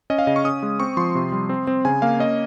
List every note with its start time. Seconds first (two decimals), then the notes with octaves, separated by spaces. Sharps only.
0.10 C#4 D#5
0.19 F5
0.27 C#3 D#5
0.36 C#6
0.44 C#4 D#6
0.63 G#3
0.80 C4 C#6
0.97 F3 C6
1.15 C3
1.32 G3
1.49 C4
1.67 C4
1.85 C#3 G#5
2.02 A#3 F5
2.19 C#4 D#5